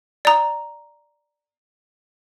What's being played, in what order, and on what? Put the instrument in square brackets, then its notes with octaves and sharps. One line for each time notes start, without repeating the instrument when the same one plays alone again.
[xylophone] D5 A#5